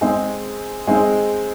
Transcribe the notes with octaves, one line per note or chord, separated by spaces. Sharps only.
G#3 C4 D#4 G#4
G#3 C4 D#4 G#4